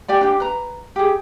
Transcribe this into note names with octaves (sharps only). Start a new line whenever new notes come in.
G4 D5 G#5
D4 G4
B4 A#5
G4 G#4